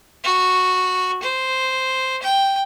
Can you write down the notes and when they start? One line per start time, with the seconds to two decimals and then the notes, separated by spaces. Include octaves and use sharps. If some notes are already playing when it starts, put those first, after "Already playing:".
0.24 F#4
1.23 C5
2.22 G5